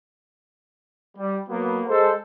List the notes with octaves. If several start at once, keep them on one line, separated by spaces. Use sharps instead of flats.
G3
F#3 A#3 B3
G#3 A4 C5